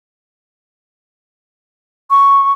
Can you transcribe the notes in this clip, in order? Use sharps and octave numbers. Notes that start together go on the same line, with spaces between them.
C#6